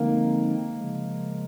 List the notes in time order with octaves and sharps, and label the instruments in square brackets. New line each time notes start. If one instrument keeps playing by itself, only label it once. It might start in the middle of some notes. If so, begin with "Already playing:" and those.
Already playing: [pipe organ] D3 F3 G#3 C4 D#4 [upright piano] A#3
[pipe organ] C#3 F3 G#3